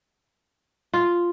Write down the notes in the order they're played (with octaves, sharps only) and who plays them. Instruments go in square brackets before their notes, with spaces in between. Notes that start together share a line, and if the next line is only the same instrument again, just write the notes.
[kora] F4